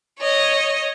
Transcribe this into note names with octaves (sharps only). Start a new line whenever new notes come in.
C#5 D#5